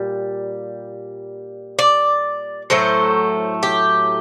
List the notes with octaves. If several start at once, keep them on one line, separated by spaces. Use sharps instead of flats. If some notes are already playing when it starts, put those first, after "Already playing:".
Already playing: A#2 G3
D5
A2 F#3 A3 C5
G4